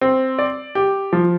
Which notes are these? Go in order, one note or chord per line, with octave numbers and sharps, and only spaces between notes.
C4
D5
G4
F3